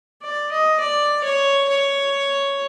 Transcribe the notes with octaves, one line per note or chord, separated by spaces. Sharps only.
D5
D#5
D5
C#5
C#5